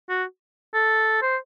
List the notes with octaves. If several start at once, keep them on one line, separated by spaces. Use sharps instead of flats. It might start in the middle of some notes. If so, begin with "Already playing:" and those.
F#4
A4
C5